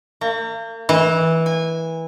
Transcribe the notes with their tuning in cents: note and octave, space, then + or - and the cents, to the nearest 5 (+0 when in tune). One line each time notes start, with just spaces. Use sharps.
A#3 -40
E3 -15
G#5 -25